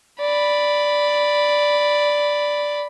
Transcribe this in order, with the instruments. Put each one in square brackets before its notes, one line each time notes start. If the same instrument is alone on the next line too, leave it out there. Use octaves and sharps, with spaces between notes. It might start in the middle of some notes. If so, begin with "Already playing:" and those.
[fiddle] D5 B5